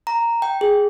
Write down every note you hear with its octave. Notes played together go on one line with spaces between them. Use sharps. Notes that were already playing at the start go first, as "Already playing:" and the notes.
A#5
G5
G#4